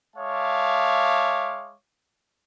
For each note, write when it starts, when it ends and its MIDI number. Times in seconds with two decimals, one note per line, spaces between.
0.16 1.74 56
0.16 1.74 73
0.16 1.74 76
0.16 1.74 77
0.16 1.74 81
0.16 1.74 86